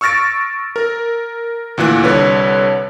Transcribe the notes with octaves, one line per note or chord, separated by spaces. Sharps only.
C#6 E6 F6 A6 A#6 D7
A#4
D2 A#2 E3 F#6
C2 D3 B4 C#5